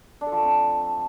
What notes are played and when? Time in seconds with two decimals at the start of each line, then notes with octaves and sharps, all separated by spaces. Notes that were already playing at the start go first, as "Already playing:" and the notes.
0.21 D4
0.26 A4
0.32 F3
0.37 A3
0.43 C4